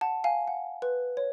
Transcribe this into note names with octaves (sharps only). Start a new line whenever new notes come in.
F#5 A5
F5 G#5
F#5
B4
C#5